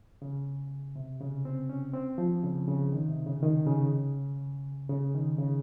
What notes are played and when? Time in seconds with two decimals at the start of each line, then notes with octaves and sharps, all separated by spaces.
0.22 C#3
0.96 C3
1.21 C#3
1.45 C4
1.69 C#4
1.94 C4
2.18 F3
2.43 C#3
2.68 C#3
2.92 D#3
3.09 C3
3.26 C#3
3.42 D#3
3.67 C#3
4.90 C#3
5.14 D#3
5.38 C#3